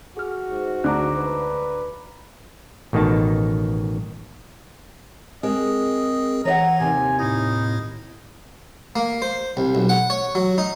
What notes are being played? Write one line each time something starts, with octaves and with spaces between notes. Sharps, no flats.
F#4 G#4 F6
G#2
D2 A#5 D6 F#6
B4
A1 B2 D#3 D#4 A5
G#3 C4 G#4 A#4 D#5
E3 C#5 D#5 F#5 A#5
D#2 C3 G#5
A2 D#4 E4
A#3
C5
C2
B1
F#5
C#5
F#3
D#4